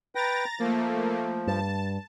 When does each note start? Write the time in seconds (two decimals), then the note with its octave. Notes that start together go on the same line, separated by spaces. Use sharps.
0.15 B4 G5 A#5 A6 A#6
0.60 F3 A3 A#3
1.47 G2 A5